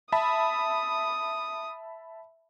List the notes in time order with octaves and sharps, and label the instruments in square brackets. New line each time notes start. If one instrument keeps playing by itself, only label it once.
[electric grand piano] E5 A5 B5 [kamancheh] D#6